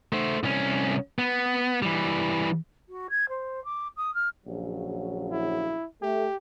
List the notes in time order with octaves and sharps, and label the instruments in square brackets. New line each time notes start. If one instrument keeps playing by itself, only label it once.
[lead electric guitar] A3 C5
C2 C#4
B3
E3 G3
[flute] F#4
G#6
C5
D6
D#6
F6
[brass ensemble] A#1 C#3 F#3
[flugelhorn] E4
[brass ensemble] A3 [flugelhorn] G4